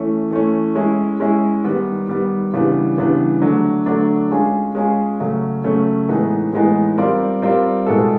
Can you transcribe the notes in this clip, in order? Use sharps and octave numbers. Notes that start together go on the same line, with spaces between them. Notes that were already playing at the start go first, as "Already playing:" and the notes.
Already playing: E3 A3 C#4
E3 A3 C#4
G#3 C#4 E4
G#3 C#4 E4
D#3 G3 B3
D#3 G3 B3
C#3 E3 G3 B3 D4
C#3 E3 G3 B3 D4
D3 F#3 A3 D4
D3 F#3 A3 D4
G#3 C#4 F4 G#4
G#3 C#4 F4 G#4
C#3 F#3 A3 C#4
C#3 F#3 A3 C#4
A2 E3 G#3 B3 D#4
A2 E3 G#3 B3 D#4
G3 C4 F4 A#4 D5
G3 C4 F4 A#4 D5
B2 G#3 B3 E4 A4